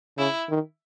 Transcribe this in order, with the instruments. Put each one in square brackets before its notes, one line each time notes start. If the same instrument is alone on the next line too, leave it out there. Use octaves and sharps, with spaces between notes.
[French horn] C#3 [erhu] E4
[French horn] D#3